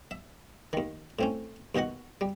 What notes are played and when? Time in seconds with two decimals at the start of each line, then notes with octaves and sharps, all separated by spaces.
0.11 E5
0.73 D#2 D#3
1.19 A2 C4 C#4
1.75 D#2 B2 D#4 F#4 F#5
2.21 G3